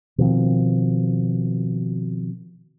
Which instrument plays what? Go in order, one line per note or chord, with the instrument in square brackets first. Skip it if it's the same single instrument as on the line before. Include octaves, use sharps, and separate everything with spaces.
[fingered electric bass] B2 D#3 F3 C4